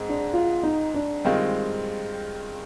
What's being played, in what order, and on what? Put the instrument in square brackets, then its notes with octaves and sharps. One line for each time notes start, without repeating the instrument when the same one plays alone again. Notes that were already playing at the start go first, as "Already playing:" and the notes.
Already playing: [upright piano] G#2 G#3 C4
[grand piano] D4
F4
D#4
D4
[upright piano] G2 D#3 G#3 C4 F4